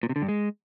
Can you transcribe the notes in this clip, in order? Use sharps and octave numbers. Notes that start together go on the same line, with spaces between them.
A#2
C3
D3
G2
G#3